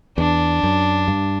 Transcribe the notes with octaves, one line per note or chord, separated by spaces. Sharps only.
E2 D4
F#2
G2